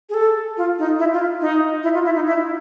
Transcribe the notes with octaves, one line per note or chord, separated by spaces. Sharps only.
G#4
A4
F4
D#4
E4
F4
D#4
E4
F4
E4
D#4
E4